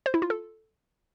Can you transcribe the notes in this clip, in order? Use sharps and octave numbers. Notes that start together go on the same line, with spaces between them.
C5
E4
F4
A4